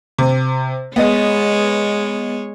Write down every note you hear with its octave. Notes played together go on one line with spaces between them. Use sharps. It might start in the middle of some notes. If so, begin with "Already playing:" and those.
C3
G#3 B3 C#5 D#5